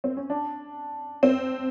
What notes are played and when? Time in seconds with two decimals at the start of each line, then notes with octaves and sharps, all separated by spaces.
0.04 C4
0.17 C#4
0.30 D4
1.23 C4